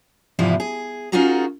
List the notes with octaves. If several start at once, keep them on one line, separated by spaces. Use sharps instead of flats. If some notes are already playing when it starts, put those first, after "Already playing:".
E2 G#2 C3 F3 G#3 E4
G#4
C#4 D#4 F4 F#4 G#4 A#4